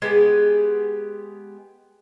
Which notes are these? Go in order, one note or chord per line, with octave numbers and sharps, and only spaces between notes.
G#3 B3 G4 G#4